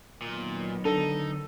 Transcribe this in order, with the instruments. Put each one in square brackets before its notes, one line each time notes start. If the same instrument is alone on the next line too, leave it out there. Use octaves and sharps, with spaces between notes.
[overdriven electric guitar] A#2 [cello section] D#3 F#3 B3
[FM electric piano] D3 [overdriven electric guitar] D#4 [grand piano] A4